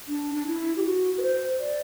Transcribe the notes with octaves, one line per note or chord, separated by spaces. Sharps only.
D4
D4
E4
G4
F#4
B4
C5
D5